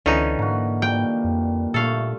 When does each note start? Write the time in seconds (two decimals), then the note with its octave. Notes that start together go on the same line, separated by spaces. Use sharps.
0.06 C#2 D3 E3 C#4 D#4
0.39 G#2 A#3 F#4
0.82 A#2 F3 G3 G5
1.24 F2
1.74 G2 A#2 A3 E4 A4 F5